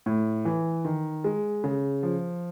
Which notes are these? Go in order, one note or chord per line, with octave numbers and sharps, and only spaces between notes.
A2
E3
D#3
G#3
C#3
F3